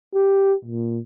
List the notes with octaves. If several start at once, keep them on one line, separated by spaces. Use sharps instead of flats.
G4
A#2